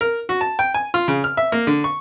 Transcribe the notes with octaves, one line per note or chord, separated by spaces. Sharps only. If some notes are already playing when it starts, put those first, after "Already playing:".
A#4
F#4
A5
G5
G#5
F4
C#3
F6
E5
A#3
D3
C#6